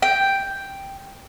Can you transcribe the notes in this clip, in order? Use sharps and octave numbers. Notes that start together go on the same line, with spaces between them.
G5